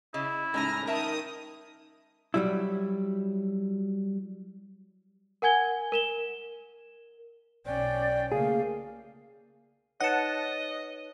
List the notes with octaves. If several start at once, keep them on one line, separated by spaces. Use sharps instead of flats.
C#3 E4 D#5
A2 C#3 G#3 C#4 D#4 G#5 A#5 F6
D#3 A#4 E5 A5 D#6
F#3 G3 E4
A#4 F#5 G#5 G#6 G7
A#4 E7 G7
B1 C#4 D5 G5
C#3 A3 A#3 G#4 F5
D#4 B4 C#5 D#5 F#5 A5